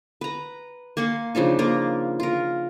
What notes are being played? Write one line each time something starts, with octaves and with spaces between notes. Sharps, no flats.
B4 A#5
A#3 G#5 C6 C#6
C#3 F3 D4 D#4
A#3 F4 A#4
F4 A#4